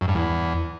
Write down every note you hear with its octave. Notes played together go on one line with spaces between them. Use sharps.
F#2
G2
E2